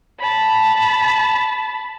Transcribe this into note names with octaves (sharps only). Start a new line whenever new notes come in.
A5 B5